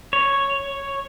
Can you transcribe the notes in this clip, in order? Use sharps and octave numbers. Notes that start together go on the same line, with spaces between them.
C#5